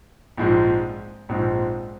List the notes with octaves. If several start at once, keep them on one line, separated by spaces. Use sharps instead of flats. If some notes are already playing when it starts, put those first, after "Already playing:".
A#1 G#2 F3 G#3 C4
A#1 G#2 F3 G#3 C4